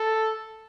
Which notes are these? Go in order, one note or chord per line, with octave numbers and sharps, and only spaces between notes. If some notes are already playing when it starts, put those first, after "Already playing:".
Already playing: A4